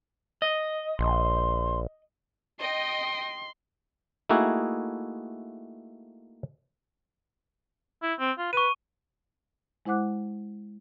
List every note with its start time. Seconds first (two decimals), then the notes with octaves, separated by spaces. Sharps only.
0.42 D#5
0.99 A#1 C6
2.61 D#5 G5 C6
4.29 A3 A#3 D#4 E4 F#4 G#4
8.02 E4
8.19 C4
8.38 F4
8.53 B4 C#6 D#7
9.85 G#3 E4 C5 F#5 D6 F#6